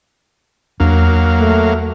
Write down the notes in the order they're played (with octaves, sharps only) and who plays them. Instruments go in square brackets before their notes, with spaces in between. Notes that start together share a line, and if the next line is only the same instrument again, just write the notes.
[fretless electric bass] E2 D4 [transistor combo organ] F#3 A#3 F5
[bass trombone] A3